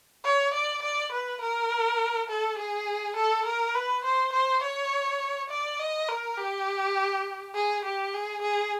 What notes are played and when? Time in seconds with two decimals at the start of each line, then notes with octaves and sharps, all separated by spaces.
0.25 C#5
0.54 D5
0.83 D5
1.12 B4
1.42 A#4
2.29 A4
2.59 G#4
3.17 A4
3.46 A#4
3.75 B4
4.05 C5
4.33 C5
4.63 C#5
5.50 D5
5.79 D#5
6.09 A#4
6.38 G4
7.55 G#4
7.85 G4
8.14 G#4
8.42 G#4